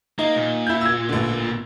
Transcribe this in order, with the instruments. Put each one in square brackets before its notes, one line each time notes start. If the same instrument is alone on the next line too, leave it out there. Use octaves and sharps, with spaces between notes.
[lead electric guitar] A#3 [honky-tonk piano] D#4
[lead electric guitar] A#2
[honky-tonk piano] E4 G6
E6 G#6
A1 D3